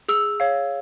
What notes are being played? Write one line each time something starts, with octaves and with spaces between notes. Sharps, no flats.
G#4 E6
C#5 F5